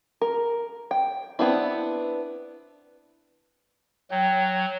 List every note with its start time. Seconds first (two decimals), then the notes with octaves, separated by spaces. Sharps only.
0.21 A#4
0.91 G5
1.39 B3 C4 D4 E4
4.11 F#3 G5